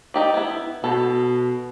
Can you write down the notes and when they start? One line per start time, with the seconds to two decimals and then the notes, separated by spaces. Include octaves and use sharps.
0.14 D#4 G4 D5
0.34 B3 E4
0.84 B2 A4